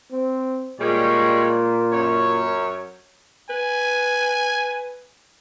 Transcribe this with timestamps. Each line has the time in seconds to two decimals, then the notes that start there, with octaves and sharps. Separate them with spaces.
0.11 C4
0.80 A#2 G3 G#3 C#5
1.92 F#2 C#5
3.50 B4 G#5